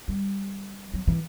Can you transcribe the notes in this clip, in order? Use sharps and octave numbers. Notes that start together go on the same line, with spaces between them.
G3
F#3
E3